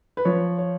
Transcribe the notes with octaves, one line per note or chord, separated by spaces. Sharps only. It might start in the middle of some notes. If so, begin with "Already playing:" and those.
B4
F3 C#5
C#5